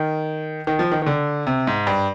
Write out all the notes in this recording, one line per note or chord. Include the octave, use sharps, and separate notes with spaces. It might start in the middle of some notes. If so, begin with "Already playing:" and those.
Already playing: D#3
D#3
F3
D#3
D#3
D3
C3
G#2
G2